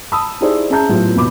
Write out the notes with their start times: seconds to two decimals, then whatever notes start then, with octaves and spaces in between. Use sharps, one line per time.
0.12 A5 B5 D#6 E6
0.41 D#4 E4 G4 G#4 C5 D5
0.70 C#4 G#4 E5 A5 A#5 G6
0.89 A2 F#3 B3 F4 G4
1.16 D#2 B2 B3 B5 D6